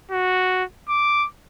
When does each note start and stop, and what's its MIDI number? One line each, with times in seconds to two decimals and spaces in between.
0.12 0.64 66
0.89 1.26 86